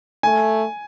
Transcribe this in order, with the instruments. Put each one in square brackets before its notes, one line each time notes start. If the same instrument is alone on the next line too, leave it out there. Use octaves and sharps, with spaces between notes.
[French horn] A3 [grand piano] G#5